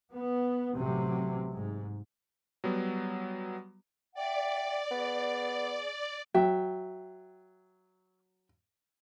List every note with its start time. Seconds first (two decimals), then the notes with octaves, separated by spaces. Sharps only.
0.13 B3
0.77 A1 C3 F#3
1.55 G#2
2.64 F#3 G3 B3
4.14 D5 E5 F#5 G5
4.91 B3 G#4
6.34 F#3 E5 G5